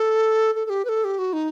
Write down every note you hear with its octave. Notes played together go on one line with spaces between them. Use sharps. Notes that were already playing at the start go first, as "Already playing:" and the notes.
Already playing: A4
A4
A4
G4
B4
A4
G4
F#4
D#4